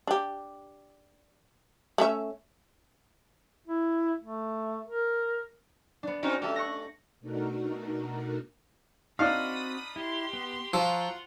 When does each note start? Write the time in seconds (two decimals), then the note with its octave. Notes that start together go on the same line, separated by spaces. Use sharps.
0.07 D4 G4
1.98 A3 C#4 E5
3.68 E4
4.21 A3
4.86 A#4
6.03 B3 D4
6.23 C4 C#4 D#4 F#4
6.42 A3 G4 A4
6.56 C#6 F#6 A#6
7.20 B2 A3 D4 D#4 F#4 A#4
9.19 C4 D4 D#4 F#4 F5 B5 D#6
9.96 E4 G4 C6
10.33 B3
10.74 F3 F4 F#5 A#5 C#6 E6